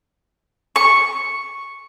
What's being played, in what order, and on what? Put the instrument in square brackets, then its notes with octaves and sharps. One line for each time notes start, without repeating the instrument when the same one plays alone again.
[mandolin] C#6